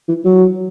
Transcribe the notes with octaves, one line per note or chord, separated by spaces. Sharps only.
E3
F#3